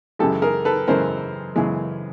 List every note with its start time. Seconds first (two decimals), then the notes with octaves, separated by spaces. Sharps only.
0.19 F#2 C#3 E3 G#3 G4 A4
0.42 G#4 A#4
0.65 A4 B4
0.88 F#2 C#3 E3 G#3 A#4 C5
1.56 F#2 C#3 E3 G#3